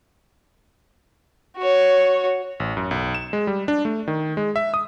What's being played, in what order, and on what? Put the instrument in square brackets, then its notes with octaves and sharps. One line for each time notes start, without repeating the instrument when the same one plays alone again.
[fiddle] F#4 C#5
[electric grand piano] A1
F#2
B1
E7
G#3
G3
D4
A3
D#3
G#3
E5
D#6